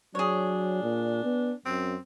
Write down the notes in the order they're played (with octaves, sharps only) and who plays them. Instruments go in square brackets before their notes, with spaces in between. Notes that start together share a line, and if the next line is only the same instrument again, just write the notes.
[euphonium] F#3 [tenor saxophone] D4 [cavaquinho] G#4 C#5
[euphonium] A#2
B3
[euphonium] F#2 [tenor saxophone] C4